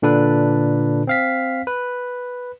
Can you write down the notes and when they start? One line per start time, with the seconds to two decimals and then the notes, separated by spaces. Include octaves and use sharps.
0.02 A#2 D3 D4 A4 B4
1.07 C4 F5 B6
1.67 B4